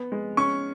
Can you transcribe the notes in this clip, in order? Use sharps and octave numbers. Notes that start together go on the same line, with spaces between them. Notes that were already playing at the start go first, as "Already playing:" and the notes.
Already playing: B3
G#3
C#4 C#6